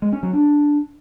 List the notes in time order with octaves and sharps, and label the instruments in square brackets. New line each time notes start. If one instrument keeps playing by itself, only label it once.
[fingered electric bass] G#3
C#4
F#3
D4